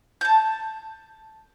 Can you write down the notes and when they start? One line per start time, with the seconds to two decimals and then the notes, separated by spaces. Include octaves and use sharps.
0.21 A5 G6